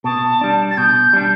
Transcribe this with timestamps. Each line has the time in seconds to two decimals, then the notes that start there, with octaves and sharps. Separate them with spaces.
0.04 B2 A5
0.41 G3 D4
0.71 A6
0.77 B2 G6
1.13 G3 D4